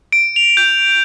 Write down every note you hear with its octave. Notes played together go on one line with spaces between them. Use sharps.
D7
F7
G6